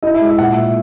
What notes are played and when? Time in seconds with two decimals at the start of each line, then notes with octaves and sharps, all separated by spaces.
0.03 E4 D#5
0.14 E5
0.21 G#3
0.27 E5
0.38 A#2 F#5
0.56 A#3 E5